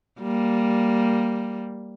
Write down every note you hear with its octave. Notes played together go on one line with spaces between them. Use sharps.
G3 A#3